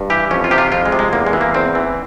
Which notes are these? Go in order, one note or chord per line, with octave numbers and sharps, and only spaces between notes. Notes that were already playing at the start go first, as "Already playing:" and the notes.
Already playing: G2
E3 G4
F2 C#4
F4
C3 G4
F4
F2 F4
G#3
C3
G#3
E2 A#3
G#3
E3
A#3
E2 C4
E3